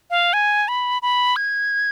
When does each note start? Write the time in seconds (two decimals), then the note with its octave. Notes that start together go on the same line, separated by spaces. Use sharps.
0.10 F5
0.33 G#5
0.68 B5
1.02 B5
1.36 G#6